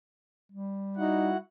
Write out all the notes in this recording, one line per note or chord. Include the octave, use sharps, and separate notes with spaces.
G3
D#4 E4 F#4 F#5